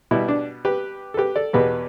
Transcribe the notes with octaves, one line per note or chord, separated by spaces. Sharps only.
B2 G3 B3 E4
D4
G4 B4
A4
G4 B4
A4 D5
E2 B2 B3 G4 B4